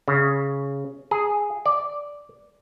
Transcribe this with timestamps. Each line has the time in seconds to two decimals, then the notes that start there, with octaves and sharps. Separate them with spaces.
0.08 C#3
1.11 G#4
1.66 D5